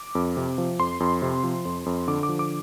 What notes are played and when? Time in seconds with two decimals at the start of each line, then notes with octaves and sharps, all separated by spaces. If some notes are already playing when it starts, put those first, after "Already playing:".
Already playing: D6
0.15 F2
0.37 C3
0.58 F3
0.79 F2 C6
1.00 F2
1.22 C3
1.43 F3
1.65 F2
1.86 F2
2.08 D3 D6
2.23 D6
2.29 F3
2.39 D6